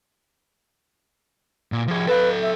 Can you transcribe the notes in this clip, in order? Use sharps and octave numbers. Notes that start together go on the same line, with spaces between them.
A#2
F3 G#4
A4 B4 F5
E5